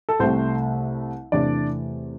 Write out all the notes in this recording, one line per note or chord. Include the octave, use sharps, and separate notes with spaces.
A4
C2 C3 A3 C4 C5
E2 C3 A3 D4 D5